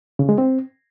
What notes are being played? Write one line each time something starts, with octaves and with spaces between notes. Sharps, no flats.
C#3
G#3
C4